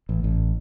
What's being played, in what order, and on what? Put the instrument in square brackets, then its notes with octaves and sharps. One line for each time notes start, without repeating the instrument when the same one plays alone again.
[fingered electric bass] A1
A1